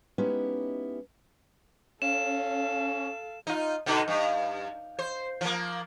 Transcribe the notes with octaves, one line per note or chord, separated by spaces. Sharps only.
G#3 B3 C#4 D#4 E4 G4
C#4 A4 F5 E7
D#4 F4
B2 D3 D#4
G2
C5
F3 A#3